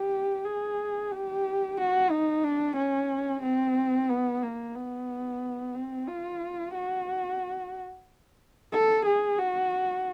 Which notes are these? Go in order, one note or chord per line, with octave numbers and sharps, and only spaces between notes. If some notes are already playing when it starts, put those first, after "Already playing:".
Already playing: G4
G#4
G4
F#4
D#4
D4
C#4
C4
B3
A#3
B3
C4
F4
F#4
A4
G#4
F#4